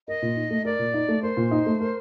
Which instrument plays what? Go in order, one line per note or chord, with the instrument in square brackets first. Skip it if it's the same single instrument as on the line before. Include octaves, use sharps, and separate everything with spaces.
[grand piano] A#4 [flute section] D#5
[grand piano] A#2
D#4
A3
[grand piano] A#4 [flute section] D5
[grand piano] A#2
D#4
A3
[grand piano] A#4 [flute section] C5
[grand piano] A#2
D#4
A3
A#4